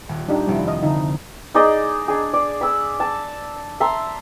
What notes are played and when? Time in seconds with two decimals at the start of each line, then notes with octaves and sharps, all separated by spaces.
0.09 D#1
0.29 D4 D#4 G4
0.47 F1 G3 C4 E4
0.68 D#5
0.83 D3 D#4 E4
1.55 D#4 G#4 D5 D#5
2.08 D4 G#4
2.33 D5
2.61 B5 E6
3.00 A5
3.80 E5 A5 A#5 C6